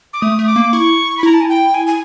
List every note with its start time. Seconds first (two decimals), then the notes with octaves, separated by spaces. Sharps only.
0.13 D6
0.21 A3 D#6
0.39 A3
0.47 D6
0.56 A#3
0.73 E4 C#6
1.18 B5
1.23 E4 A#5
1.34 A5
1.41 G#5
1.49 G5
1.74 G#5
1.87 G#5